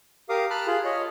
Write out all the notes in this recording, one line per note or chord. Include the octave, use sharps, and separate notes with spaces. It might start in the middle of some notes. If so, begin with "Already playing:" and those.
G4 A#4 F5 D6 D#6
A5 B5 F6 F#6
F4 G#4
C#5 D#5